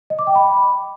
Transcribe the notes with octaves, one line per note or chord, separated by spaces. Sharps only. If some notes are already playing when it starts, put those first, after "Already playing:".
D#5
D6
G5
B5